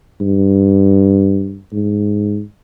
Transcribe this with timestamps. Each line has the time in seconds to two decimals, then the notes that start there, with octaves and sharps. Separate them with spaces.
0.21 G2
1.72 G#2